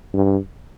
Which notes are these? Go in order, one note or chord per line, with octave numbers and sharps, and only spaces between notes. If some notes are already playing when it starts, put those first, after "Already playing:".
G2